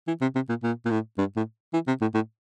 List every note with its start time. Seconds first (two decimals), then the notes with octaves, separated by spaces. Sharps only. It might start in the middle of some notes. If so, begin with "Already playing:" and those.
0.07 E3
0.21 C3
0.35 C3
0.49 A#2
0.63 A#2
0.85 A#2
0.91 A2
1.18 G2
1.36 A2
1.74 E3
1.87 C3
2.01 A2
2.15 A2